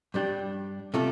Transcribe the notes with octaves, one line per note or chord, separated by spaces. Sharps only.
G2 G3 D4 G4
C3 A3 F4 A4